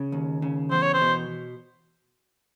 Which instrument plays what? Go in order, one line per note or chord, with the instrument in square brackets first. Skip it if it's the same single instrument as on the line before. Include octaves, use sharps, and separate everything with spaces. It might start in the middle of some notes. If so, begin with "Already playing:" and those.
Already playing: [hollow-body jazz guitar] C#3
D#2
C#3
[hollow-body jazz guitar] E2 [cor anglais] C5
[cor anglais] C#5
C5
[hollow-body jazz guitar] B2